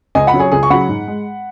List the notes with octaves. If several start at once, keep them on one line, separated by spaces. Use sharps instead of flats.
C#2 D#5 G#5
F#5 B5
C#3 F#3
G#4 C#5
C#2 G#4
C#6
C#3 F#3 F#5 B5
G#2
G#3